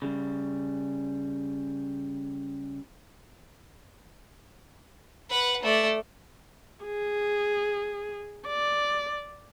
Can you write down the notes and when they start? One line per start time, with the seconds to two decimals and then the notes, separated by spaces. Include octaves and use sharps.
0.02 C#3 G3
5.30 B4 F#5
5.63 A3 D5
6.85 G#4
8.47 D5